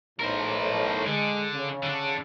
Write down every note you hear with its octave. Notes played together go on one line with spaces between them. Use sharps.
B1 A2 A#4 C5
D3 G#3
C#3
D3 D4